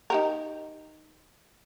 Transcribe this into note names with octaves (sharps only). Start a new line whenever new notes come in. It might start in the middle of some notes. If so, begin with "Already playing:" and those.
D#4 G4 A#4